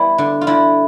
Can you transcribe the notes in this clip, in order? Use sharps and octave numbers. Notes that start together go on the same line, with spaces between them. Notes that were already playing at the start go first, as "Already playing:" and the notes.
Already playing: G3 B3 E4
D3
F4
D3 E4